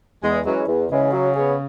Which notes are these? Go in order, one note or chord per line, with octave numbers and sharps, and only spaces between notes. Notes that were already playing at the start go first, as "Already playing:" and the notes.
E2 G#3
E3 F#3 G#3 C#4
E2
C#3 E3 G#3 C#4
F#3
B3 G#4 C#5